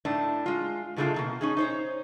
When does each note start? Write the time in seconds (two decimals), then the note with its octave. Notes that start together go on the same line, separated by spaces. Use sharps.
0.05 A2 D4 D#4
0.46 G#3 F4
0.96 A2 C#3 G#3 A3 D4 F4
1.14 B2 D#3 A#3
1.41 C#4 D#4 G#4
1.57 D#4 C5 C#5